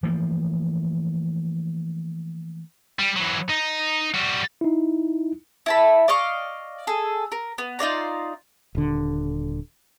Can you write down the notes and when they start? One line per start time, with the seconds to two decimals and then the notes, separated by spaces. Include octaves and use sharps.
0.03 E3 F3 A3 A#3
2.99 G3
3.17 E3 F#3
3.49 D#4
4.14 G3 F#4
4.61 D#4 E4
5.66 E4 A5 B5
6.08 D5 D#5 F5 C#6
6.87 G#4 A4
7.32 A#4
7.58 B3
7.79 D#4 F4 D5 A#5
8.75 D#1 D3